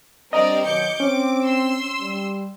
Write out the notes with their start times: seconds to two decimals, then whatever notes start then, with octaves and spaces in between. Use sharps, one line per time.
0.33 G3 C4 D4 A#4 D5 D#5 A#5
0.65 B2 D#3 F#3 D6 G6 C#7
1.00 C4 C#4 D6
1.45 C6 E6
2.00 G3